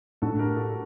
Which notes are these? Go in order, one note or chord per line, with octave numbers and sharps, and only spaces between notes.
A2 A3 D4 F#4 A4
G4 A#4
F#4 A4